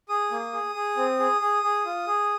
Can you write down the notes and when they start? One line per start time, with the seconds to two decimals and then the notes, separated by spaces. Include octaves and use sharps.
0.09 G#4 D#6
0.31 A#3
0.53 G#4
0.75 G#4
0.97 C4
1.19 G#4
1.41 G#4
1.63 G#4
1.85 F4
2.07 G#4